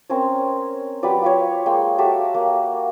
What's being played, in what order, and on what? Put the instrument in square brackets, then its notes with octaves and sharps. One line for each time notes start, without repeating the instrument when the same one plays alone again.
[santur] C4 C#4 A#4 C#5
F#3 G4 B4 D5
F4 G4 C#5
G#3 A#3 G5
F#4 G4 A4 E5
A#3